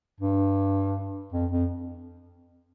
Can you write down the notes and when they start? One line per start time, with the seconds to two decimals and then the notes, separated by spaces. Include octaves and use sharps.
0.21 G2
1.33 F2
1.52 F2